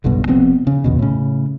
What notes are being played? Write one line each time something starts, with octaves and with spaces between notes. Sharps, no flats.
F#1 B1 G2 B2
F1 F2 B3 C4
C#3
A#1 E2 B2
A2 C#3